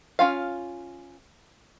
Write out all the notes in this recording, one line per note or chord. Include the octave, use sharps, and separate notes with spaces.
C#4 F4 F5